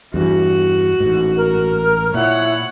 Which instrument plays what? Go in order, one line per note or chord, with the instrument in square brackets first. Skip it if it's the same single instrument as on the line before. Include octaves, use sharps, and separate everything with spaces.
[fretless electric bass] E2 G2 E3 [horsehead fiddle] F#4
[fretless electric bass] A1 G#2
[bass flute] A#4
[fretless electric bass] A#2 [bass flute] E4 [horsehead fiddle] C#5 F#5